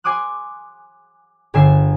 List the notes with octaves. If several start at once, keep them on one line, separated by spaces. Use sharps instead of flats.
G#5 C6 D6 D#6 F#6
G1 D3 G#5 E6 C7